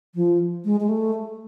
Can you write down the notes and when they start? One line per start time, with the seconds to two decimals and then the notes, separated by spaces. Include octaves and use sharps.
0.15 F3
0.65 G#3
0.80 G#3
0.89 A3